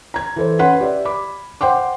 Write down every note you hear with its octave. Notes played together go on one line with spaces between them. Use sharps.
A#5 G#6
E3 A4 C5
C#4 B4 F#5 C6
G4 D5 E5
B5 D6
C5 F#5 G5 C6 D6